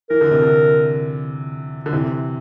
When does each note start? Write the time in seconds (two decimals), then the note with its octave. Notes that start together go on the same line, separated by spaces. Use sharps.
0.10 E3 A#4
0.21 D3
0.31 C3
0.42 D3
1.86 D3
1.93 C3 E3